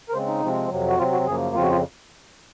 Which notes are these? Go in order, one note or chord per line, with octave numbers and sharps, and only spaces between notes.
A#4
C#3 G#3 C4 C5
D#4
C3 F3 G#3 C4
F2 C3 F#3
F#4
C3 F#3 C4 F4
F#4
F#2 C#3 F3 A#3 G#4
F2 C#3 F3 C4 F4
F#4
F4